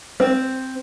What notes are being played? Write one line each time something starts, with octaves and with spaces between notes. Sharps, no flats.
C4